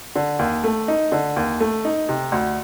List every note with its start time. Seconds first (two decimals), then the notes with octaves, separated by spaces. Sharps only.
0.16 D3
0.39 D#2
0.64 A3
0.88 D#4
1.12 D3
1.36 D#2
1.60 A3
1.85 D#4
2.09 C3
2.32 D2